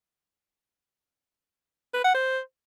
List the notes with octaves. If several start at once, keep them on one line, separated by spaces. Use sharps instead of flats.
B4
F#5
C5